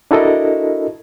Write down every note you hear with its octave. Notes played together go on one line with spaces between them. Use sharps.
D4 E4 F#4 A4 A#4 D#5